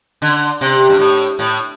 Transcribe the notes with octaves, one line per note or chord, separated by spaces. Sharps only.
D3
C3
G2
A2
A2